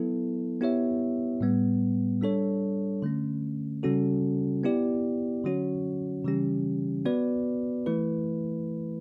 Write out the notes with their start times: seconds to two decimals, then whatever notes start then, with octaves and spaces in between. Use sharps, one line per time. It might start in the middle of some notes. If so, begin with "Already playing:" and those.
Already playing: F#3 B3 E4 A4
0.61 B3 E4 G4 C#5 E5
1.41 A2 G3 B3
2.21 G3 D4 A4 C#5
3.02 D3 A3 C#4
3.83 C#3 G3 C#4 F#4 A4
4.64 B3 E4 G4 D5
5.44 D3 F#3 C#4 F#4 C#5
6.24 C#3 E3 G3 C#4 G4
7.05 B3 F#4 B4 D5
7.86 E3 A3 E4 B4